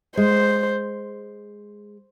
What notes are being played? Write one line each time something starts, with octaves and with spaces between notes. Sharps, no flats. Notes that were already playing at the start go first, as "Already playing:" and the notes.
G#3 C5